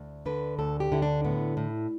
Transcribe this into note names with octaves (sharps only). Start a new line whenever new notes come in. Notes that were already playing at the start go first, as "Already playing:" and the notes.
Already playing: D2
D3 B4
D2 A4
G4
D3 E4
D4
A2 B3
A2